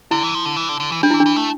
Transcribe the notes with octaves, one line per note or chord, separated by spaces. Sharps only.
D3 E4
E3
F3
D3
E3
D3
D3
E3
G3 D4
E3 E4
D4
E3
A3